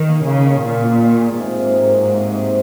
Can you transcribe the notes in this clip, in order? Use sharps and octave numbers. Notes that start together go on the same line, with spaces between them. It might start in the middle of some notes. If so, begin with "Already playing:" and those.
Already playing: D#3
A#3
C#3 A#3
D#3
A#2 F4
F4
D#3
G#4
G#2 C3
C3
A#3
F#3
C3
C3